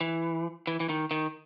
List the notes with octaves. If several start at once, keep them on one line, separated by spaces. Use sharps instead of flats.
E3
E3
E3
D#3
D#3